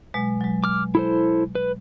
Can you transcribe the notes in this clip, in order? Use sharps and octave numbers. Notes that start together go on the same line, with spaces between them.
B2 F#3 G#3
F#3 G#3
D6 F6
E4 A4 C5
B4